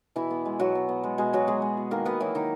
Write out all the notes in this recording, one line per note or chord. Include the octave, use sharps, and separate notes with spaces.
B2 E3 E4
B3
G#3
B2 F#3 F#4
B2
B3
G#3
B2 G#3 G#4
B2 F#3 F#4
G#3 B3 G#4
G#3
B2
D#3 A#3 A#4
A#3 B3 B4
E3 F#3 E4
D#3 D#4